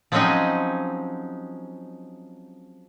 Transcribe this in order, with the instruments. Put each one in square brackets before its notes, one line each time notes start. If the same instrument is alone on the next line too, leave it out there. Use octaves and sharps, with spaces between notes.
[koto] F3 F#3 G#3 C4 C#4 D#4